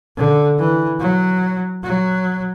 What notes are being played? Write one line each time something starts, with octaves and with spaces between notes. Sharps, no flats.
D3
E3
F#3
F#3